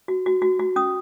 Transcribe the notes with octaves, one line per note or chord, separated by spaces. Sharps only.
F#4
F#4
F#4
F#4
C#4 D#6